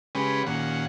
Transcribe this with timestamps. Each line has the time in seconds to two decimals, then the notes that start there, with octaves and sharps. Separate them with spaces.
0.15 C#3 G#3 C#4 G4 B4
0.46 D#2 A#2 C#4 F#5